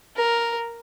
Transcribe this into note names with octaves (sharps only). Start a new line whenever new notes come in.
A#4